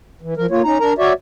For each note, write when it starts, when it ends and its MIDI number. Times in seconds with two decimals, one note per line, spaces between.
0.22 0.34 52
0.37 0.46 53
0.37 0.46 70
0.51 0.62 58
0.51 0.62 65
0.51 0.62 73
0.64 0.78 61
0.64 0.78 63
0.64 0.78 82
0.80 0.93 62
0.80 0.93 70
0.80 0.93 82
0.98 1.13 66
0.98 1.13 73
0.98 1.13 74
0.98 1.13 76